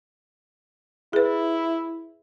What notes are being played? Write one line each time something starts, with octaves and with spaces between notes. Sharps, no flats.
E4 G#4 B4